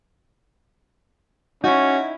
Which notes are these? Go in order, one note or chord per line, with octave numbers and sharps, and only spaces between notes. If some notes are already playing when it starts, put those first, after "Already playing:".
C#4 D#4 E4 F#4